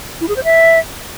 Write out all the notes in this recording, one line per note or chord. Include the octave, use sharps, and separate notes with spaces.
E4
G#4
C5
E5